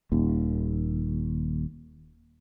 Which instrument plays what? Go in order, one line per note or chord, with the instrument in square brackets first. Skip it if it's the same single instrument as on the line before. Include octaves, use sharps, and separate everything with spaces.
[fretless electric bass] D#1 D#2